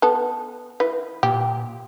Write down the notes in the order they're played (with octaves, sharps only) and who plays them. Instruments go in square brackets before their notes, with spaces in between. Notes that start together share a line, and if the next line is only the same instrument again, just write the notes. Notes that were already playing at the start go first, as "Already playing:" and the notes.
[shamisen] B3 A4
E3 B4
[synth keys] A#2 [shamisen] G4